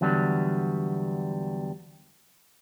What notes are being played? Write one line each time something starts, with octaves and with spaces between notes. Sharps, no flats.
E2 D3 F#3 G3 B3